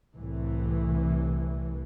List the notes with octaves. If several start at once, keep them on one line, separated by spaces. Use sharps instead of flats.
C2 A2 E3